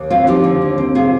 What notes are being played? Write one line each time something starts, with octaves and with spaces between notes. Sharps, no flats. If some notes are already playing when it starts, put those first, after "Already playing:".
Already playing: D#2
C4 F4
F3 D#4 G4
D3
D#2
C4
C3 F4 G#4